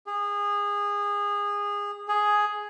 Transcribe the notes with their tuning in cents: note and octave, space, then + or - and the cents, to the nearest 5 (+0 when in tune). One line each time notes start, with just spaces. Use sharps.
G#4 -25
G#4 +5